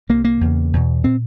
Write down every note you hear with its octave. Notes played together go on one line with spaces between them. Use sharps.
C2 C3 A#3
A#3
E2 C#3
E2 B2
A#2 C4